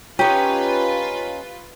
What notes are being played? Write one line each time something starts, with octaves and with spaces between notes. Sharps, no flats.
C#4 D#4 F4 G4 B4